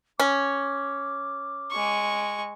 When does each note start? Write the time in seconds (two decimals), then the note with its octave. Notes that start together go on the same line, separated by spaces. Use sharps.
0.20 C#4 D6
1.71 G#3 C#6